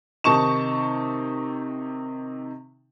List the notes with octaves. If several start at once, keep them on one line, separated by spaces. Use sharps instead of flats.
C3 D#3 D#4 A5 C#6 E7